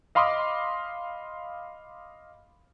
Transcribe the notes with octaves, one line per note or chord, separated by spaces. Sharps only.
D#5 F5 B5 C6 D6 D#6